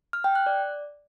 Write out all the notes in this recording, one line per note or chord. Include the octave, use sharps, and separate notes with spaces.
F6
G5
F#6
D5